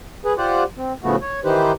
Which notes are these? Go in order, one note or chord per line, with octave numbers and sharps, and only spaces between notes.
G#4 B4
F4 G4 C5 D5 F#5
C4
A2 C#3 F3 A3 B3 F#4
C#5
D#3 E3 D#4 G4 B4 C5